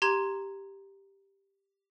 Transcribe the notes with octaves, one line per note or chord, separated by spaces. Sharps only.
G4 A#5 C6 G#6 E7